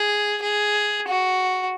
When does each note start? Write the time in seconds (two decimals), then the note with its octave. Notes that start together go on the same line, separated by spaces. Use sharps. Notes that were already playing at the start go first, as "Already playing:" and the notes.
Already playing: G#4
0.43 G#4
1.08 F#4